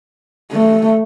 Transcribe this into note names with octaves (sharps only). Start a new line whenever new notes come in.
A3